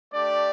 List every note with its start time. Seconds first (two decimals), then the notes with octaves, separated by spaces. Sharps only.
0.12 A3 D4 G4 D5